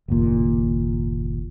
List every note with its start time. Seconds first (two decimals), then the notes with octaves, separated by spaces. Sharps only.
0.08 F#1 D#2 A#2